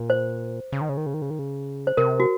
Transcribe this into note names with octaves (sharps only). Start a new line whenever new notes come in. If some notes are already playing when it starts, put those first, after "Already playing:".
Already playing: A#2
C5
C#3
D#3
C#3
D#3
C#3
D#3
C#3
D#3
C#3
C5
C3 A#4
F#4